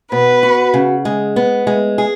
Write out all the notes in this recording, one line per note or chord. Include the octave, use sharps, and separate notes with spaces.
B2 B4
F#4
C#3
G#3
B3
G#3
G#4